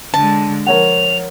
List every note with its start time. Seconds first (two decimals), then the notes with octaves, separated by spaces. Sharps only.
0.14 D3 G#3 A5
0.67 F3 A#4 C#5 F#5 F7